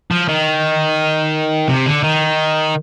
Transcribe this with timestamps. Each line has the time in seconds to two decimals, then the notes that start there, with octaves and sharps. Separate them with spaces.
0.11 F3
0.28 D#3
1.68 C3
1.86 D3
2.04 D#3